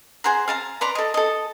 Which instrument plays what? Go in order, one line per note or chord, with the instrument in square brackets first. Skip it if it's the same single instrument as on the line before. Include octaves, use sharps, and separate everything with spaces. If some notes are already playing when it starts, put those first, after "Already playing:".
[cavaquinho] G#4 C5 F#5 A#5
F5 A5 A#5
B4 D5 A#5 C6
A4 D#5
A4 D#5